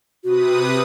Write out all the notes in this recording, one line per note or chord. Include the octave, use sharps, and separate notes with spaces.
C3 F#4 B4 D#6